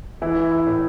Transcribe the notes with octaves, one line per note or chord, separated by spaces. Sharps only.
E3 E4
E4
A2